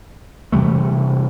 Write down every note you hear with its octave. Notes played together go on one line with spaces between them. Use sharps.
C3 E3 G3 A3